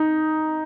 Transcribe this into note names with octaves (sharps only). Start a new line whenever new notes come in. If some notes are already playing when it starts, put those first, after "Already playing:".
Already playing: D#4